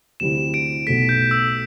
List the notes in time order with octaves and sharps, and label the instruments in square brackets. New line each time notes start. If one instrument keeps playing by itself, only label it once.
[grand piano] D2 C3 G3 C4 E4 [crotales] E7
[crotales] D7
[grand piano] B1 B2 A3 [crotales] B6
[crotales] G6
E6